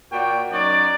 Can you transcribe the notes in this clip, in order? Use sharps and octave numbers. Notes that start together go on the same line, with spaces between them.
A#2 A#3 F#4 C#5 D5 G5
F#2 F#3 D#4 C#5 D5